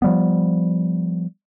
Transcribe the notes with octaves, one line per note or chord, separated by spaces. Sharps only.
F3 G3 B3